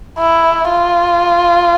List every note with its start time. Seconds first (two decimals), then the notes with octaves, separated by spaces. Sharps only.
0.19 E4
0.69 F4